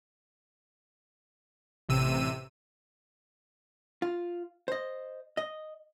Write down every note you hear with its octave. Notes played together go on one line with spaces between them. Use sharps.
A1 C3 E6 D#7
F4
C5 D#5
D#5